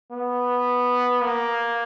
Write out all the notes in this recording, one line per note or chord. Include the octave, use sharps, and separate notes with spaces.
B3
A#3